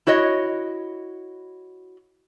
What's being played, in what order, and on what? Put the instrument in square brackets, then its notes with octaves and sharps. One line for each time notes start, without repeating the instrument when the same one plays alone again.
[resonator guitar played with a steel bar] E4 F#4 C#5 D#5